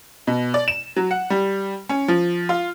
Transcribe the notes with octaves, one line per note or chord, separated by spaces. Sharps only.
B2
D5
E7
F#3
F#5
G3
C#4
F3
F4